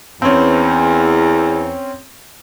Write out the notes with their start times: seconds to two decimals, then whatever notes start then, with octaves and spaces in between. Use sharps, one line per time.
0.22 E2 C4 C#4